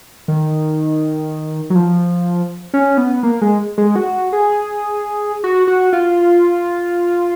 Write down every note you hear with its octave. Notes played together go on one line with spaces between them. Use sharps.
D#3
F#3
F3
C#4
B3
A#3
G#3
G#3
F#4
G#4
F#4
F#4
F4